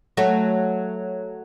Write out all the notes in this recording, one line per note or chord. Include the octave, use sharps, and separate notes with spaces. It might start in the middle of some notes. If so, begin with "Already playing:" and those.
F#3 A3